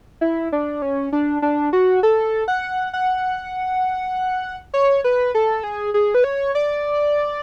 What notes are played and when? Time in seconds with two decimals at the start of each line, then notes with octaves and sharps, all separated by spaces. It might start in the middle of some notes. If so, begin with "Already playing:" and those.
0.21 E4
0.52 D4
0.82 C#4
1.12 D4
1.42 D4
1.73 F#4
2.03 A4
2.48 F#5
2.93 F#5
4.74 C#5
5.04 B4
5.35 A4
5.63 G#4
5.94 G#4
6.14 B4
6.24 C#5
6.55 D5